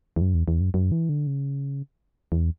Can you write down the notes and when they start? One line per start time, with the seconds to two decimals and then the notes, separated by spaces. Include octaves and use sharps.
0.16 E2
0.21 F#2
0.34 E2
0.48 E2
0.61 F#2
0.74 F#2
0.92 E3
1.09 D3
1.27 C#3
2.32 E2